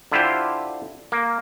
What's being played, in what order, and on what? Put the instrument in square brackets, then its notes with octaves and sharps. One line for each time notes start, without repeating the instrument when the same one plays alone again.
[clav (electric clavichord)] D3 E4 F4 G4 C5
A#3